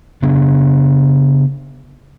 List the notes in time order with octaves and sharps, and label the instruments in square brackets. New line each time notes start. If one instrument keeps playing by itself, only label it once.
[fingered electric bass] C#3 B3 D4